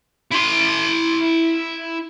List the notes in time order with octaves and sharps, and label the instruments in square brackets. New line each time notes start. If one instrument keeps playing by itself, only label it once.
[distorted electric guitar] E4 C6